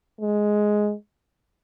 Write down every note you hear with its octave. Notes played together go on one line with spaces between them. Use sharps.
G#3